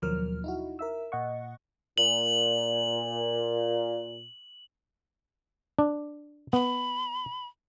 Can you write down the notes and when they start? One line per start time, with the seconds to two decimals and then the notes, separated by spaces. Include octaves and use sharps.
0.02 D#2 B2 F3 F#3 A#4 F6
0.44 D#4 E4 F#4
0.79 A#4 E5 E6
1.12 A#2 D#5 F#5 C#6
1.98 A#2 F#7
5.79 D4
6.53 B3 B5